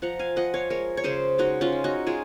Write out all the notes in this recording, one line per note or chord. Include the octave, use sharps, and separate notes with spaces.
F3 F#5 A#5
F5 G#5
F3 D#5 F#5
C#5 F5
G#3 A#4 C#5
C#5
C#3 G#4 C5
G#3 D#4 F#4
C#4 F4
G#3
D#4 F#4
G#3 F4 G#4